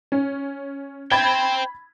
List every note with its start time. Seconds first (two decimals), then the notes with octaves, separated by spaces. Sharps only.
0.12 C#4
1.12 C5 G5 B5 G#6 A6